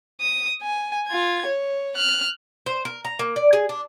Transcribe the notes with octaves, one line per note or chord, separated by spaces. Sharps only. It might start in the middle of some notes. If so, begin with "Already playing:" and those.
D#6
G#5
F4 G#6
C#5
F6 F#6
C5
A#4
A#5
A#3
D5
G#4
D4